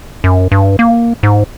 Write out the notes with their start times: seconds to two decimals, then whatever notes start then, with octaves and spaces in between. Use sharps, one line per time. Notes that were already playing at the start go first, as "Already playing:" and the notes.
0.24 F#2
0.52 G2
0.79 A#3
1.23 G#2